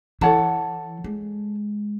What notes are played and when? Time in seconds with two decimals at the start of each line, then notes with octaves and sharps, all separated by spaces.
0.21 E3 A4 C#5 F#5 A5
1.04 G#3